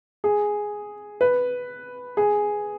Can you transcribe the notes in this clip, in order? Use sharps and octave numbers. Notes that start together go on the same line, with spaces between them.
G#4
B4
G#4